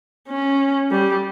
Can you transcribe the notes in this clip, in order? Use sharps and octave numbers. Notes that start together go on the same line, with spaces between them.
C#4
G3